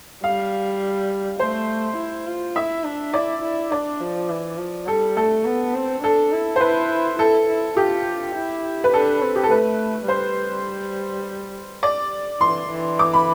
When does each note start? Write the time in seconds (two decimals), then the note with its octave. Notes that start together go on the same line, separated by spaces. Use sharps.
0.24 G3 F5
1.39 A3 C5
1.97 E4
2.27 F4
2.56 E4 E5
2.84 D4
3.14 E4 D5
3.42 E4
3.71 D4 D5
4.00 F3
4.29 E3
4.58 F3
4.87 G3 A4
5.17 A3 A4
5.45 B3
5.74 C4
6.03 D4 A4
6.32 E4
6.56 C5
6.61 E4 B4
7.19 E4 A4
7.48 E4
7.76 F4 G4
8.35 E4
8.84 B4
8.93 D4 A4
9.22 C4
9.36 G4
9.43 A4
9.51 A3 B4
10.08 G3 C5
11.83 D5
12.41 E3 C6
12.70 E3
12.99 D6
13.13 B5